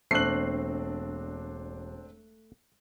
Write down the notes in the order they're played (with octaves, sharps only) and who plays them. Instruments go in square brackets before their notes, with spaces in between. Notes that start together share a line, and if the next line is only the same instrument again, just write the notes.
[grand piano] E1 F#6 [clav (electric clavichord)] A3 [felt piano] C4 D4 [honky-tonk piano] C7 F#7